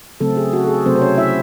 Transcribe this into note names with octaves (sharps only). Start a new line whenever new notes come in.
C#3 F#3 A3 C4 A4
G#4
F#4
A4
G#4
C3 F#3 A3 C4 C5
C5
C#4 C#5
E4 E5